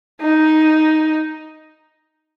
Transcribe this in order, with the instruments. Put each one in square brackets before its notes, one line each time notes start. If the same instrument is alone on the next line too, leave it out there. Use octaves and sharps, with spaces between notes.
[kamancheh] D#4